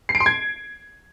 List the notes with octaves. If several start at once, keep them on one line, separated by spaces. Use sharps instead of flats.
C7
D7
C6
G#6